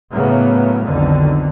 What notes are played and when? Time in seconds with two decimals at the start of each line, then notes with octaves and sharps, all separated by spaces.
0.11 A2 C#3 F#3 A#3 B3
0.84 B1 F2 D3 D#3